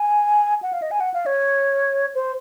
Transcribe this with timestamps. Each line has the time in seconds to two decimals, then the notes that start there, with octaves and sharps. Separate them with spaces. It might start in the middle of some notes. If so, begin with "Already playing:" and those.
Already playing: G#5
0.62 F#5
0.73 F5
0.82 D#5
0.91 G#5
1.00 F#5
1.14 F5
1.26 C#5
2.15 C5